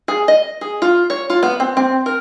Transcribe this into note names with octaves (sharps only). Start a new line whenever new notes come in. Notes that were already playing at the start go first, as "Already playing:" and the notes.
G#4
D#5
G#4
F4
C#5
F4
B3
C4
C4
A#4